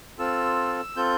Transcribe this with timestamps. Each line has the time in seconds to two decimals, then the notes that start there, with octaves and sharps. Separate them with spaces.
0.19 C4 F4 A4 E6
0.97 C4 F4 A4 G6